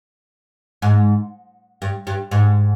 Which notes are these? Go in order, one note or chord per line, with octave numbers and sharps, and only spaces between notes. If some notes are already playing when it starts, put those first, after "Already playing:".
G#2
G2
G2
G#2